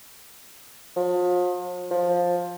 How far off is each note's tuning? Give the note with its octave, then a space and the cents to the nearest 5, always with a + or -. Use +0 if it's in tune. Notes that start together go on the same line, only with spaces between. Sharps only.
F3 +40
F3 +15